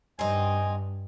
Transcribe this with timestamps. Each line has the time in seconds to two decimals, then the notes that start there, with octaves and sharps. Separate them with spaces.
0.19 G2 C4 D#4 G#5